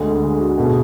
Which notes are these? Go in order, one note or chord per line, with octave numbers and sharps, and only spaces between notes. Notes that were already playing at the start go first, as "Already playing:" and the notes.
Already playing: D2 D3 G#3 G#4
G#4
F#4
B2 A3 G#4